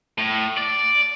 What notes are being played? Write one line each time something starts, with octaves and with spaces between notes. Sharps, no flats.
A2
D5